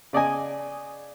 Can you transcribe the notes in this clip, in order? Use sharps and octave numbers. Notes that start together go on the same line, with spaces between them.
C#3 D5 D#5 G#5